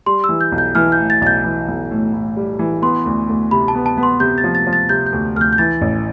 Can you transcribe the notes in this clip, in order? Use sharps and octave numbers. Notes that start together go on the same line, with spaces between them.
G3 C6
E6
E3
G6
B1
G6
E3 F6
G6
A2
A6
B1 A6
G6
E3
B1
A2
A2
G3
E3
B3 C6
D2
D2
C3 B5
A5
B3
A5
B3
C6
C3 G6
A6
F3
A6
F3
A6
C3 G6
G6
D2
D2 F6
G6
G6
E3 A6
A1